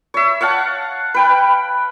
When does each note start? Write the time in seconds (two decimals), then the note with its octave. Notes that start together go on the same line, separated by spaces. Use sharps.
0.14 C#5 E5
0.41 C#5 F5 F#5 A5
1.14 B4 G5 B5